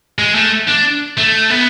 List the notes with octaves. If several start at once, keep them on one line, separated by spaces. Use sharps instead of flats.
G#3
A3
D4
A3
B3